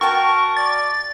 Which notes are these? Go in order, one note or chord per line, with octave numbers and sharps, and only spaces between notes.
F#4 A#4 G5 A5 C#6
D5 A6